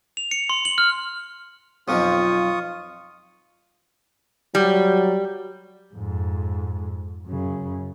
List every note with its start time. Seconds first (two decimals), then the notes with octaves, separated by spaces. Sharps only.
0.17 F7
0.31 C#7
0.50 C6
0.65 F#7
0.78 F6
1.88 B1 F2 F3 F4 C#6 D#6
4.55 F#3 G3
5.95 F2 G#2
7.27 F#2 C#3